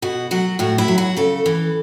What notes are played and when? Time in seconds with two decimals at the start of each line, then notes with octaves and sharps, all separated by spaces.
0.02 B2 F#4
0.31 F#3 F#4
0.59 A2 F#4
0.78 E4
0.88 F#3
0.98 F#4
1.17 C#3 A4
1.46 E3